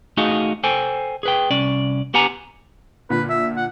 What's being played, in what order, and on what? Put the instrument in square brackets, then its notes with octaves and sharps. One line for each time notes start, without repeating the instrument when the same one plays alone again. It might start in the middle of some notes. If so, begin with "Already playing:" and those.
[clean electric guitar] A3 D#4 F#4 G#4 D#5 F5
A4 C5 G5 G#5
G#4 B4 G5
C2 C#4 D5
B3 G4 F#5 G#5 A#5
[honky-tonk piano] A#2 D3 [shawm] B4
[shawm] E5
F#5